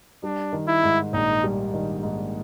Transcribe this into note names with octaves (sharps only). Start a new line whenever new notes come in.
G3 D4
D#3
E4
G#2
A#1 D#4
G3
D#3
G#2